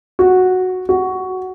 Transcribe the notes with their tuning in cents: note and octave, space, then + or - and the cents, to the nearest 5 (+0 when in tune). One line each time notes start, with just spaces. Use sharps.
F#4 -5
F#4 +10